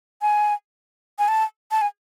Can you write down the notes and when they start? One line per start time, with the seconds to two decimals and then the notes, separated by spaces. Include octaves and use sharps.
0.22 G#5
1.19 G#5
1.28 A5
1.71 A5
1.81 G#5